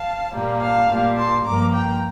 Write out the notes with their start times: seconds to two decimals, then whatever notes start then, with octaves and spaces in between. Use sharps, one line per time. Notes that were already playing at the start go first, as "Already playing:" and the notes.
Already playing: F5 A5
0.33 A#2 G3 A#3
0.61 F5 A5
0.89 A#2 G3 A#3
1.17 A5 C6
1.45 G2 F3 A#3 A#5 D6
1.73 G5 A#5